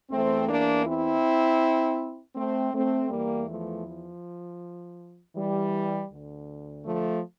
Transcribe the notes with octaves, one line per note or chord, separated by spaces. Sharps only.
E2 E3 A3 C4
A#3 D4
C4 E4
A3 C4
A3 C4
E2 E3 G3 A#3
F3 A3
F3
E3 G3
D2 D3
F3 A3